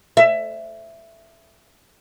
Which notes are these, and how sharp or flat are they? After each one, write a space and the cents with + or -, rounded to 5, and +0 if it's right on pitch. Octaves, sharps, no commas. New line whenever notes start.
E5 +15